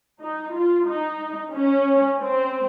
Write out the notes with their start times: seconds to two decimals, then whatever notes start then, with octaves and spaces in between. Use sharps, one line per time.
0.21 D#4
0.54 F4
0.87 D#4
1.55 C#4
2.22 C4